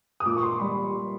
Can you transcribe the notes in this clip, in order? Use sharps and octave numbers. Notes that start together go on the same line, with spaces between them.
D#6
A#2 D6
C#6
C6
G3 B5